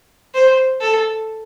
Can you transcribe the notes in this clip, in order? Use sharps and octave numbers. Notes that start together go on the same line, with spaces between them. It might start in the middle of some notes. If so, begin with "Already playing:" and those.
C5
A4